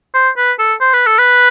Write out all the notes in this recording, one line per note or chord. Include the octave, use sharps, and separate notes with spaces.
C5
B4
A4
C5
B4
A4
B4